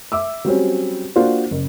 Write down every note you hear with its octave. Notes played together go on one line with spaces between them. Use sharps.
E5 D6 E6
F#3 G3 C4 C#4
A#3 D4 F4 F#4 C5
F#1